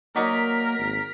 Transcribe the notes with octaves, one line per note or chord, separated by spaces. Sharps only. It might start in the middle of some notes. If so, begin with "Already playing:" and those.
F#3 A#3 D#4 A#4 D5 B6
G#1